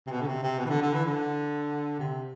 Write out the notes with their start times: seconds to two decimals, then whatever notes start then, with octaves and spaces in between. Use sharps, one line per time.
0.06 C3
0.11 B2
0.21 D3
0.27 C3
0.43 C3
0.58 B2
0.65 E3
0.69 D3
0.82 D3
0.94 E3
1.05 D3
1.99 C3